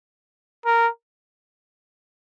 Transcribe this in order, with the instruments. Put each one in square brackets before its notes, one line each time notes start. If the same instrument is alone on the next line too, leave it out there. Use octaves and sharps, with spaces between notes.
[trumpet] A#4